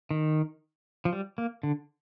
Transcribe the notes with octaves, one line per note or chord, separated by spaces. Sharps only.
D#3
F3
G3
A#3
D3